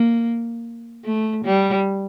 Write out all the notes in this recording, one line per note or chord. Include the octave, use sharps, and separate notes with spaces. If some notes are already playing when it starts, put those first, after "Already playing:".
Already playing: A#3
A3
G3